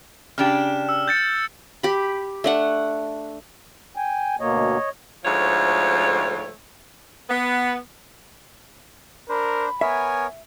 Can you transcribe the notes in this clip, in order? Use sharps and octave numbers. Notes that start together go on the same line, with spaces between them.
C#3 D4 G4 F6 E7
E6
G6 A6 C#7
G4 B5
A3 D4 F#5
G5 G#5
D2 B2 A#3 C#5 D#5
D2 G#2 F3 A3 C#5
B3
D4 A#4 C5 B5
B3 A#4 C#5 E5 G#5